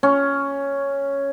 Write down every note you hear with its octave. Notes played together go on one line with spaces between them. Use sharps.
C#4